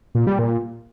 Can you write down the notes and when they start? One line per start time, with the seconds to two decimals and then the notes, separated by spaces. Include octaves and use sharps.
0.15 A#2
0.27 G3
0.39 A#2